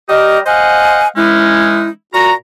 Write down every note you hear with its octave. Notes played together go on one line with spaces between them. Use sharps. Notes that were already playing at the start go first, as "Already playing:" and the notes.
G3 G4 A#4 D#5
C5 D#5 F5 F#5 G#5
E3 G#3 C#4 D#4 E4
A#2 F#4 A#5